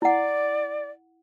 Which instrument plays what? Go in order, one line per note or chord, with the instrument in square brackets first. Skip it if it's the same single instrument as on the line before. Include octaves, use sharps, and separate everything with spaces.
[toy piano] E4 F#5 [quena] D5